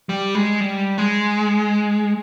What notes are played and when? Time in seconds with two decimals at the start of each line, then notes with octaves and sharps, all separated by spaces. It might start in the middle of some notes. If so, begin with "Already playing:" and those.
0.09 G3
0.35 G#3
0.60 G3
0.98 G#3